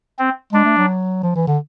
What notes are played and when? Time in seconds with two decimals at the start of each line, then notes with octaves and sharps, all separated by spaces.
0.19 C4
0.53 G#3 D4
0.65 A3
0.77 F#3
1.23 F3
1.36 E3
1.48 D3